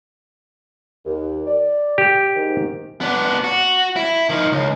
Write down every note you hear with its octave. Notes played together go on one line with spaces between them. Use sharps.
D#2
D5
G4
G#2 D#3
B3 D4
F#4
E4
D#3 F3
C#2